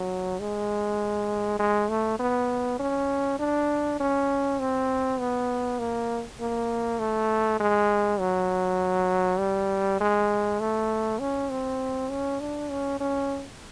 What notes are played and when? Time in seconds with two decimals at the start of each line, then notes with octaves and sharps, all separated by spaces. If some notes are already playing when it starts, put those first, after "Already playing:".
Already playing: F#3
0.40 G#3
1.59 G#3
1.89 A3
2.19 B3
2.79 C#4
3.39 D4
4.00 C#4
4.60 C4
5.20 B3
5.79 A#3
6.40 A#3
6.99 A3
7.60 G#3
8.20 F#3
9.39 G3
10.01 G#3
10.61 A3
11.20 C#4
11.51 C4
12.10 C#4
12.40 D4
12.70 C#4
13.00 C#4